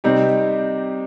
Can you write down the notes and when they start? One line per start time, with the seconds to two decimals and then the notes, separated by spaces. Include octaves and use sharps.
0.04 C3 G3 C4 D#4 G4